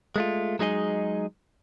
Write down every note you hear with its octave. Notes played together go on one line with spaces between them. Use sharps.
G#3 A3 F4
F#3 G#3 D#4 G#4 D#5